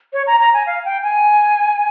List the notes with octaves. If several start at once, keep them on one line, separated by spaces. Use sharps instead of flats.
C#5
A#5
A#5
G#5
F5
G5
G#5